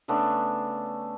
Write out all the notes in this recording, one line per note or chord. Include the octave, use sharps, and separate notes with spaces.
C#3 A3 B3 D4